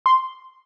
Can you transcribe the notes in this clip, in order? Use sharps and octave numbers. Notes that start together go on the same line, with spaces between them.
C6